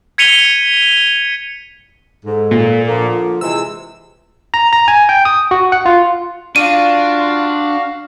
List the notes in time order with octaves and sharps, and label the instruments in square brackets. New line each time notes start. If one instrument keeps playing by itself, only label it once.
[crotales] G#6 B6 C#7 D#7 F7 G7
[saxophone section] G#2 [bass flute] A4
[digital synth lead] A#2
[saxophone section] D3 F3 A#3 [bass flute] F4
[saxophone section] C3 E3 G#3 [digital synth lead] E6
[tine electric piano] A#5
A#5
G#5
G5
D#6
F#4
F#5
F4
[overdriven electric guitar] D4 [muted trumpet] F4 [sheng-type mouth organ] F#4 F5 [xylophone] D#7